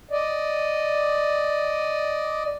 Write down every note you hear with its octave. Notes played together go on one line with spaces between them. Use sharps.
D5 D#5